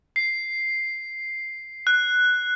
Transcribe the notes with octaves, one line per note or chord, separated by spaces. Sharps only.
C7
F#6